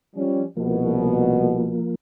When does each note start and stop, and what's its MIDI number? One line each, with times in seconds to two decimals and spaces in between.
0.16 0.43 53
0.16 0.43 55
0.16 0.43 61
0.57 1.82 36
0.57 1.82 47
0.57 1.95 53
0.57 1.95 58